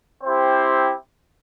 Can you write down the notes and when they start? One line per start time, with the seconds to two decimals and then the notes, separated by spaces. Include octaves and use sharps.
0.23 C4 E4 G4 C5